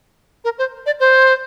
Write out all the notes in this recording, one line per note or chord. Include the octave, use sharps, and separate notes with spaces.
A#4
C5
D5
C5